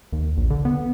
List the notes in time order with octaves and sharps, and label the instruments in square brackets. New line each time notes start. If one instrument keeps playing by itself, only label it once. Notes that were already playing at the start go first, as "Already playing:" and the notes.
[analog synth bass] D#2
A#1
D3
B3